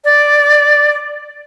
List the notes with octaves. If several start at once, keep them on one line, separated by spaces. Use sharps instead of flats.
D5